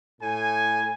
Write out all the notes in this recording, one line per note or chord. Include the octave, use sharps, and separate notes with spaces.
A2 G#5